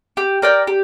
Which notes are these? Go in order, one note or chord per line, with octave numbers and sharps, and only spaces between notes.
G4
A#4 D5 G5
G4